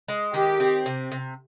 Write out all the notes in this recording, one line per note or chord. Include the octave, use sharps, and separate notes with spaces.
G#3
D#3 G4
C4
C3
C3